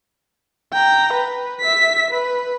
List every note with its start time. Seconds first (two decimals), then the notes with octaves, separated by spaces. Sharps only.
0.73 G5 A#5
1.13 B4
1.61 E5 B6
2.11 B4